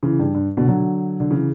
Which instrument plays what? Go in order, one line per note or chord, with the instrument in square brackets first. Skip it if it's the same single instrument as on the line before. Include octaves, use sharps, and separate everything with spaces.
[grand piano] C#3 E3
G2
G2
B2 D3
D3 F#3
D3
C#3 E3